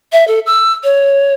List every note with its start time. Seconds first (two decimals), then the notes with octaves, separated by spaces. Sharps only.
0.12 E5
0.28 A4
0.46 E6
0.84 C#5